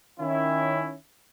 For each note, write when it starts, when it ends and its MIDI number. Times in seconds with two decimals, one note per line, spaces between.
0.20 0.94 51
0.20 0.94 61
0.20 0.94 64